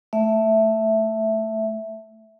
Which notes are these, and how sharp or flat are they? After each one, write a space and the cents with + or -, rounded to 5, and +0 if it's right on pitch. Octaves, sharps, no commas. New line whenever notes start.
A3 +5 E5 +0